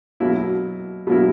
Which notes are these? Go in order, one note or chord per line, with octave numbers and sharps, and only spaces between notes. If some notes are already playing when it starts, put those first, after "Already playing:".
B2 F#3 A#3 E4
B2 F#3 A#3 E4